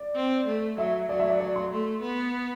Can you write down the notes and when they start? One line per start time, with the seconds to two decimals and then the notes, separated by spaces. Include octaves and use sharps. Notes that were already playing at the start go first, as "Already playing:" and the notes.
Already playing: D5
0.16 C4
0.47 A3
0.78 F#3 E5
1.09 F#3 D5
1.19 E5
1.30 D5
1.40 D5
1.56 C6
1.71 A3
2.02 B3